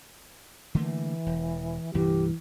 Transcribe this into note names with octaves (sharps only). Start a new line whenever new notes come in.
D3 E3 A3 A#3
E1
C2 G2 A#2 E3 G4